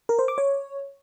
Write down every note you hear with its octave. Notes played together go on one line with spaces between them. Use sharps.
A#4
C5
D6
C#5